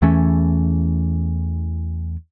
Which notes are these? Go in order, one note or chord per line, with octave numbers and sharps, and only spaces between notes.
E2 E3 A3 C#4